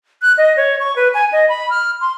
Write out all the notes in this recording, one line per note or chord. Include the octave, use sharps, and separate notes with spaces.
F#6
D#5
C#5
C#6
B4
G#5
D#5
B5
F6
C6